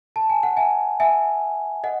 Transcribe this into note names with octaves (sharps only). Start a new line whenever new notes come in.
A5
G#5
F#5
E5 G#5
E5 G#5
D#5 F#5